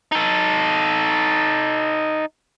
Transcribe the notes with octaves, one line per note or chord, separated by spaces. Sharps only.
D#4 A4